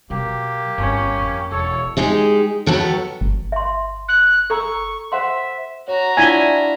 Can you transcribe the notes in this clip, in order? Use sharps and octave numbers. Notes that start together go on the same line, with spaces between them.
B2 F#3 A#3 G4
G1 C#4
F2
E1 A4 C#5
G#3 D#4 G4 G#4
D#2 F#3 B3 A4 G5
G1
E5 C6
F#6
A4 A#5 C#6 E6
C5 E5 F#5 C6
F#4 C#5 A#5
D4 E4 F4 E5 G#5 B6 G7